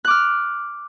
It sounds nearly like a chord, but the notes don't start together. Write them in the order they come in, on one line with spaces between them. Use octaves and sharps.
F#6 D6 F6